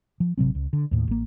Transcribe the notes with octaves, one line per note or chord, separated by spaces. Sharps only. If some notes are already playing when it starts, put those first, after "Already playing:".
F3
G#1 C3 F#3 C4
C#2
D3
D#2 A2
A1 A#3